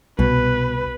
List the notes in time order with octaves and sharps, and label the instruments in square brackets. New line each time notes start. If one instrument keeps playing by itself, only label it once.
[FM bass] C2 [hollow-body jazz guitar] B2 [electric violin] B4